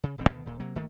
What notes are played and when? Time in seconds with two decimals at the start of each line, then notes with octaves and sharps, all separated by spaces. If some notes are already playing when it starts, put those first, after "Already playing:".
0.04 C#3
0.18 D#1 A1 E2 C4
0.29 D2 B2 D#3
0.46 D#1 A#2
0.60 C3 F#3 A#3
0.75 G1 D#3 A3 A#3